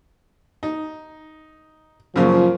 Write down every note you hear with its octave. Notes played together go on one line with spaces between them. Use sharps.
D#4
F#2 A#2 C#3 F3